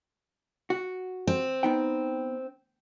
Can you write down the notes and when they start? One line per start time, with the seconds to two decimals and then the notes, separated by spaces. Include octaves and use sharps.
0.70 F#4
1.27 C4
1.63 B3 D#4 G5